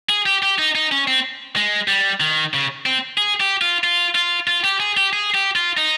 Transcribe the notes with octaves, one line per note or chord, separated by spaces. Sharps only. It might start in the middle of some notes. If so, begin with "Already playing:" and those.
G#4
G4
G4
D#4
D#4
C#4
C4
G#3
G3
D#3
C#3
C4
G#4
G4
F4
F4
F4
F4
G4
G#4
G4
G#4
G4
F4
D#4